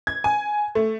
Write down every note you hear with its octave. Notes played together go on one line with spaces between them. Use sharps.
G#6
G#5
A3